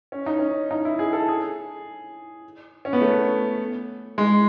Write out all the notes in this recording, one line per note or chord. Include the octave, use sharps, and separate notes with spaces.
C#4
D#4
C#4
D#4
E4
G#4
A4
G#4
C#4
B3
A3
G#3